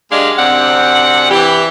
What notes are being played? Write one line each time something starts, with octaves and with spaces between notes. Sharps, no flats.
F#2 G#3 D4 G4 D#5 F5
F#2 C3 C4 D4 F#5
E3 G4